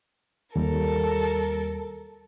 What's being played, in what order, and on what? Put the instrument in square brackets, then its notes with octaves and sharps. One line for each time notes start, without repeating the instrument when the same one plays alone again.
[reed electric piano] D#2 G3 [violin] A4 A#4